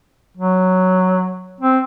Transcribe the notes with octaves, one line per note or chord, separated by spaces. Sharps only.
F#3
C4